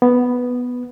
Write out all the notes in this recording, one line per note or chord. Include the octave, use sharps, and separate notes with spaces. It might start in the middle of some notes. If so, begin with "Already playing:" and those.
B3